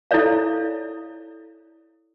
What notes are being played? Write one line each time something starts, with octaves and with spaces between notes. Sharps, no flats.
E4 A4 C#5 D5 F5